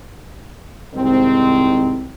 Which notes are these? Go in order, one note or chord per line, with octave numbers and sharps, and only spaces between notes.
C2 G#2 D#3 C4